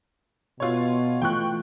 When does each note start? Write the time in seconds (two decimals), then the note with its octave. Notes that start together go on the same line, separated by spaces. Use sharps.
0.60 B2 F4 C#5
1.22 E3 A3 F4 G5 C#6 F#6